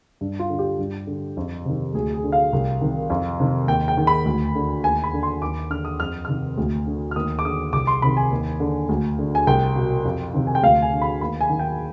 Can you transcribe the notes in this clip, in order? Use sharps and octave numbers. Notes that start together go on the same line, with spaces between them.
G2
F4
D3
G4
G2
D3
F2
C3 D#3
D2 G#4
G#4
D3
F5
C2
C3 D#3
F2
C3 D#3
D#2 G5
G5
D#3
B5
D2
D3
D#2 G#5
B5
D3
C6
D#2 D6
D3 F6
D#6
F2 F6
C3 D#3 F6
D2
D3
F6
D#2 D#6
D6
D3 D#6
C2 D6
C6
C3 D#3 B5
G#5
D#2
D3
D2
D3
G#5
C2 G5
B2
F2
C3 D#3
G#5
G5
D2 F5
G#5
D3
B5
D#2 B5
G#5
D#3
G5